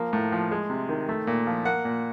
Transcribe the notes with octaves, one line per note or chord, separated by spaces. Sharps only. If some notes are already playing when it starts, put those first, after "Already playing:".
Already playing: F3 A#3
A2
F3
G#3
C3
D#3
A3
A#2
F3
A#3 F#5
A#2